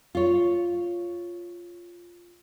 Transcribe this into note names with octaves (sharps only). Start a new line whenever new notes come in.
F4 C#5